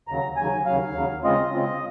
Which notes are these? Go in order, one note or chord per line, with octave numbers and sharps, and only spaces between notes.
D#2 C#3 F#3 A#5
D#2 C#3 F#3 G#5
D#2 C#3 F#3 F5
D#2 C#3 F#3
C#3 G#3 C4 F4 D#5
C#3 G#3 C4 F4